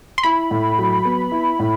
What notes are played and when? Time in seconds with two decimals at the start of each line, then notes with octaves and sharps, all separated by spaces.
0.18 C6
0.23 E4 B5
0.51 A2
0.78 F#3
1.05 B3
1.32 E4
1.59 A2